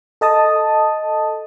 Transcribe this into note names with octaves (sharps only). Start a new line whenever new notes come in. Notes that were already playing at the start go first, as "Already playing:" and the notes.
A4 D#5 A5 D#6